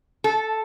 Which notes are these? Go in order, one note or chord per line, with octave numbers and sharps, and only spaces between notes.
A4